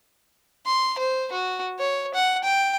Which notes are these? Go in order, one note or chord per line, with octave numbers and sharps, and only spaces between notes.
C6
C5
F#4
C#5
F#5
G5